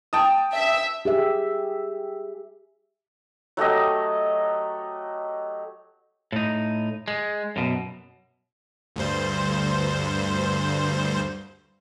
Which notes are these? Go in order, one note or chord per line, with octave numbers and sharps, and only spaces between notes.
G5 A5 D#6
E5
G4 G#4 E5
F#3 A3 G4 D#5
A2 D#4
G#3
F#2 B2
D2 G2 C5